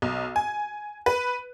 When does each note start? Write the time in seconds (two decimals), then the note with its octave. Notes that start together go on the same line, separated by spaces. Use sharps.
0.02 B1
0.36 G#5
1.06 B4